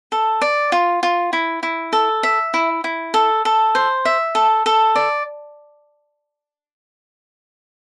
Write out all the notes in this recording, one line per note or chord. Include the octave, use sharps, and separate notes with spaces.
A4
D5
F4
F4
E4
E4
A4
E5
E4
E4
A4
A4
C5
E5
A4
A4
D5